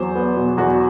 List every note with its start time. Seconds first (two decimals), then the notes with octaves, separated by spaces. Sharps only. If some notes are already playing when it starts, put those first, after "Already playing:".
Already playing: E2 F#3 C5
0.15 B3
0.37 B2
0.57 E2 F#4